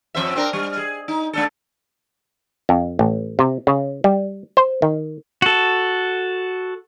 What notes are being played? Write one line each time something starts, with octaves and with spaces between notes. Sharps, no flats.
F2 C5 E5
C4 D4 A#4
G3
G#4
D#4
A3 D4 A4
F2
A1
C3
C#3
G3
C5
D#3
F#4 A4